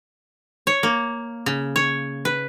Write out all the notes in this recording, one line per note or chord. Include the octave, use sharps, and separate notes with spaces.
C#5
A#3
C#3
C#5
B4